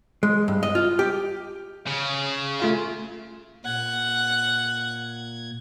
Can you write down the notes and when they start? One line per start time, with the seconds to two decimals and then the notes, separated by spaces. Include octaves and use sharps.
0.23 G#3
0.48 G2
0.63 D#5
0.75 F4
0.99 G4
1.87 C#3
2.60 A3 F4 F5
3.65 A#2 F#5 G#6